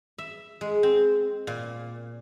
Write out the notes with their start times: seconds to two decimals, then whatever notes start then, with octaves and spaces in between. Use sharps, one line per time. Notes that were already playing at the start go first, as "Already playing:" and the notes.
0.18 E5
0.61 G#3
0.83 C4
1.47 A#2